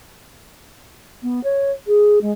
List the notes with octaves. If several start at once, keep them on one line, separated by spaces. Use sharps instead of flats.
B3
C#5
G#4
G#3